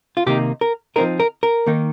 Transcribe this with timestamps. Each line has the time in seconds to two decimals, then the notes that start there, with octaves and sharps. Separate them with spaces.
0.17 F4
0.26 C3 D#3 A#3 D#4 G4
0.61 A#4
0.96 F3 C4 D#4 A#4
1.20 A#4
1.43 A#4
1.67 D#3 A#3 D#4